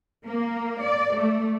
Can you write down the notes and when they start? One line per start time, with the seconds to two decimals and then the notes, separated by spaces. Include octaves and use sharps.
0.25 A#3
0.83 D5
1.16 A3